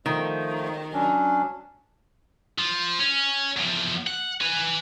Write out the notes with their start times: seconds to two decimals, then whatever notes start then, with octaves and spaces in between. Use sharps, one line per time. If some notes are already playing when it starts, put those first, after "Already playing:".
0.06 D#3 F3 A3
0.93 F#3 C#4 D4
2.58 F3
2.99 C#4
3.57 E2 F3
4.07 F#5
4.41 B4 G#5